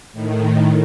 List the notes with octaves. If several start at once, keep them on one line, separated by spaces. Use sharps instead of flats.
A2 D#3